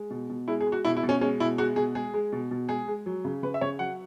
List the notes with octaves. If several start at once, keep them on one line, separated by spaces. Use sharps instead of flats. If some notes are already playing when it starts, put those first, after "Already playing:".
Already playing: G#3
B2
B2
G#3 E4
G#4
G#3
F#4
B2 E4
E4
B2
C#4
G#3 C#4
B2 E4
G#3 F#4
B2 G#4
G#3 G#4
G#3
B2
B2
G#3 G#4
G#3
F#3
C#3
C#3 B4
E5
C#3 C#5
F#3 F#5